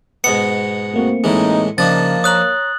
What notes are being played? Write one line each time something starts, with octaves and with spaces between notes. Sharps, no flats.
G#2 B2 B3 C#7
A3 A#3 C4 F#4
A2 E3 G#3 D#4
C#3 F3 A#3 D4 D#4 A6
C#5 A#5 D#6 F#6 F#7